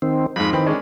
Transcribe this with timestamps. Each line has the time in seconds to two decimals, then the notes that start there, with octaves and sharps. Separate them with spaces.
0.02 D#3 C4
0.36 F2 G#2 B5
0.53 D#3 E3 C4 B5
0.66 G#3 C#4 D4